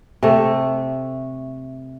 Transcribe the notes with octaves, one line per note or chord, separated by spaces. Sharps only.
C3 A3